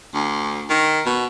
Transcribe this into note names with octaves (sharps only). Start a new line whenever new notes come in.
D2
D#3
B2